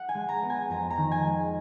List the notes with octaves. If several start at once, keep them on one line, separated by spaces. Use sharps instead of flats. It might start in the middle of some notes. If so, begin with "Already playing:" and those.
Already playing: F#5
G#5
G#3
A#5
B3
G#5
F2 A#5
A#5
D#3
G#5
G#3